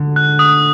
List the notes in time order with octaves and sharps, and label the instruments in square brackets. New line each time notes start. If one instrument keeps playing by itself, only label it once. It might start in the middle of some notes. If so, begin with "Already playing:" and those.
Already playing: [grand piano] D3
[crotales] F#6
D#6